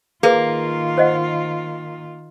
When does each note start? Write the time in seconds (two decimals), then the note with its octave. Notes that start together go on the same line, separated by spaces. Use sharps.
0.23 D#3 A#3 F4 G#4 B4
0.98 C5 D#5 F#5